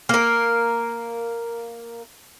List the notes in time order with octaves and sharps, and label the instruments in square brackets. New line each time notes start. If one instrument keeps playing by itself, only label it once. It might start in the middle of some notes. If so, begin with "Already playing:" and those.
[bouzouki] A#3 A#4